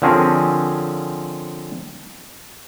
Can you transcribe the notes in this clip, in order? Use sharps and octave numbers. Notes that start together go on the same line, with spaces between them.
D3 F3 C4 C#4 G#4 A#4